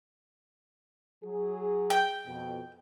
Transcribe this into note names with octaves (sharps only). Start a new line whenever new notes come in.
F#3 G#4
G5
F2 B2